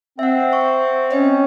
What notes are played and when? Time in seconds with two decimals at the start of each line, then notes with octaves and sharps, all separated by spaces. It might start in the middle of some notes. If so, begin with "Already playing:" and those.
0.19 C4 E5 F#5
0.52 E5 C#6
1.12 C#4 D#5 G5